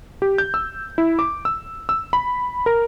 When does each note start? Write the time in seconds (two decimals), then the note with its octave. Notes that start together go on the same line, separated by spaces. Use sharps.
0.22 G4
0.38 G6
0.54 E6
0.98 E4
1.19 D6
1.45 E6
1.89 E6
2.13 B5
2.66 A#4